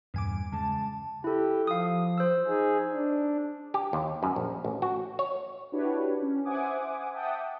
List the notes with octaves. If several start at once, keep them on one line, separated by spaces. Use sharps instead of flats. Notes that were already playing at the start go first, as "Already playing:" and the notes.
E2 G2 A#2 G#5 D6
C#3 G#3 A5
E4 G4 A4
F3 F5 D#6
C5 E6
D#4 G#4
D4
G4
D#2
F#2
A#1
A1
F#4
C#5
D4 E4 F#4 G4 B4 C#5
C#4
C5 E5 F#5 G#5 D6 D#6
E5 F#5 G5 A5 D6 D#6